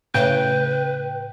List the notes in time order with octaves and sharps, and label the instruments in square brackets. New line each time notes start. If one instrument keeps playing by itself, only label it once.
[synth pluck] A2 C#3 [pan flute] B4 [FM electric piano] G5